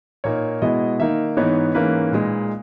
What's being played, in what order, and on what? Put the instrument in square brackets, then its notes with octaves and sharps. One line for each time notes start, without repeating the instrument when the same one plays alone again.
[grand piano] A#2 A#3 D#4 C#5
B2 G#3 B3 E4 D#5
D#3 A#3 D#4 E5
G#2 E3 B3 D#4 C#5
G#2 E3 A#3 C#4 E4 B4
A#2 G#3 D#4